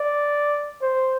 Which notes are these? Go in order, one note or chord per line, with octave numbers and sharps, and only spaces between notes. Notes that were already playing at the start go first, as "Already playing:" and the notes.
Already playing: D5
C5